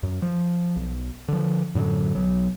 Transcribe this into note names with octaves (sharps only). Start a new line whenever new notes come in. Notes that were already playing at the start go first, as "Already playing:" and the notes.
F#2
F3
B1
D3 F3
F#2 A2 D3 F#3
B1 F#3